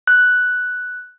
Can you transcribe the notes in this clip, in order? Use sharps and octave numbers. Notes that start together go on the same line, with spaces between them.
F#6